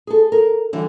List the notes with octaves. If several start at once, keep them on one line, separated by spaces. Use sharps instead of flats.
G#4 A4
A#4
D3 E3 G3